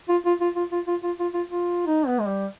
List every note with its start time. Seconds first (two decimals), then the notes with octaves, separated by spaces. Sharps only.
0.09 F4
0.25 F4
0.41 F4
0.56 F4
0.72 F4
0.87 F4
1.04 F4
1.20 F4
1.34 F4
1.50 F4
1.87 D#4
2.07 B3
2.20 G#3
2.28 G3